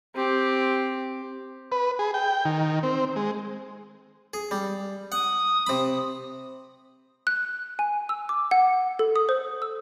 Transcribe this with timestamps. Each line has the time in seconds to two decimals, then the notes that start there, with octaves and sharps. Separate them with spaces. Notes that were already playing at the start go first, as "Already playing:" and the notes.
0.15 C4 G4
1.72 B4
1.99 G#4
2.14 G5
2.45 D#3
2.83 C4
3.16 G#3
4.34 G#4
4.51 G3
5.12 F#5 D#6
5.67 C3 B5
7.27 F#6
7.79 G#5
8.09 E6
8.29 D6
8.51 F#5
8.99 A4
9.16 D#6
9.29 C5
9.62 E6